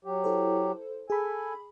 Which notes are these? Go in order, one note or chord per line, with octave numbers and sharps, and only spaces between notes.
F#3 G4
E4 A4 C5
G#4 A4 G#5 B5